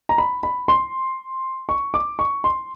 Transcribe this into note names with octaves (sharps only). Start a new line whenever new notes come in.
A#5
B5
B5
C6
C#6
D6
C#6
C6